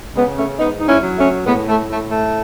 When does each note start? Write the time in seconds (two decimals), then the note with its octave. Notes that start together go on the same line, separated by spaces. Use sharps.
0.15 C#3 G#3 B3
0.37 A3 C#4
0.59 G#2 B3 D#4
0.79 D#4
0.87 C#4 E4
1.02 F#3
1.18 A3 C#4
1.46 A2 G#3 B3
1.68 A3
1.89 A2 A3
2.11 A3